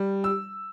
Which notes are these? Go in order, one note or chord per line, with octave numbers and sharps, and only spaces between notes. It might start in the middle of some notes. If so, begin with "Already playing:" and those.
Already playing: G3
E6